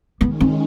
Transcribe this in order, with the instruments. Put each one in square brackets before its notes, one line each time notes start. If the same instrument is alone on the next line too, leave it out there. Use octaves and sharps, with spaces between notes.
[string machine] D#3 G#3 C#4 [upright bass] B3
[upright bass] C4